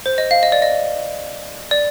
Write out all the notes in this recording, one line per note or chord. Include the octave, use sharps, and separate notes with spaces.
C5
D#5
F5
D#5
D5
D#5
D5